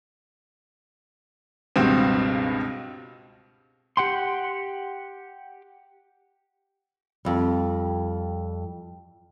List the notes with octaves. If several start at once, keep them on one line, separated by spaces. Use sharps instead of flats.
C#2 G2 B2 C4
G4 F#5 G5 C6
F2 G3